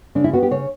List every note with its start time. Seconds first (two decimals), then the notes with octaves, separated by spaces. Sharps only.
0.15 C#3 D4
0.24 E4
0.33 B3 F#4
0.43 G4
0.51 C#3 C#5